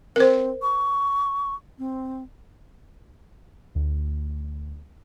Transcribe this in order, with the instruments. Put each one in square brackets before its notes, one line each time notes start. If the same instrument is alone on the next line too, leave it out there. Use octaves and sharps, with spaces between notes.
[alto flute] C4 [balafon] A#4 C5
[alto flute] C#6
C4
[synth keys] D2